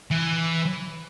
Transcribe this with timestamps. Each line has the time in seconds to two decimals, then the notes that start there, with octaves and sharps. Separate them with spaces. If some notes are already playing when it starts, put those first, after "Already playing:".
0.11 E3